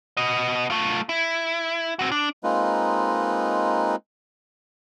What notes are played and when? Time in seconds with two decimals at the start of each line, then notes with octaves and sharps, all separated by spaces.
0.17 B3 D#5
0.70 A3 F4
1.09 E4
1.99 C4 F#4
2.12 D4
2.44 G#3 A#3 C4 D#4 F4 B4